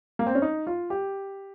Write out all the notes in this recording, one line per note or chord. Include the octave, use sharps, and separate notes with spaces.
A#3
C4
C#4
D#4
F4
G4